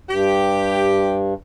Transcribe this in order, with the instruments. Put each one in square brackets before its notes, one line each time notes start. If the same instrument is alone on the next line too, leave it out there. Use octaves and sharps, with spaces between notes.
[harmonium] G2 [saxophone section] G4